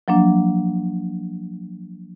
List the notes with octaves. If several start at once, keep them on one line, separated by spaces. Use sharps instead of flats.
F3 F#3 A#3 D4